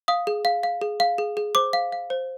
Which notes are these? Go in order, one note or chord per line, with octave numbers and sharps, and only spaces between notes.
F5 D#6
G#4
F5
F5
G#4
F5
G#4
G#4
C5 D6
F5
F5
C5